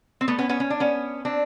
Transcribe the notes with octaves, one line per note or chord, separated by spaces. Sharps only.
C4
A3 B3
B3 C#4
B3 C#4
C#4
D4
B3 C#4
C4 D4